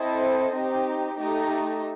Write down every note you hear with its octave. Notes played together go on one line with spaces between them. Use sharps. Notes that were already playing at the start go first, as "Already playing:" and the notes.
Already playing: C4 E4 A4 C5 D#5
C4 D#4 G4
A3 D#4 G4